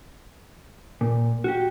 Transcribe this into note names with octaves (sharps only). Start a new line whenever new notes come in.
A#2
F#4 G4